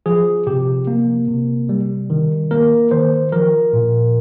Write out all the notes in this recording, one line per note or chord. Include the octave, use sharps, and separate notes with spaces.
F3 G#4
C3 G4
A#3
C3
G3
D#3
A#3 A#4
D#3 C5
F3 A#4
A#2